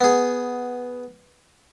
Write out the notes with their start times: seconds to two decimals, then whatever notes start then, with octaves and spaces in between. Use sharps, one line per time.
0.01 B3 G#4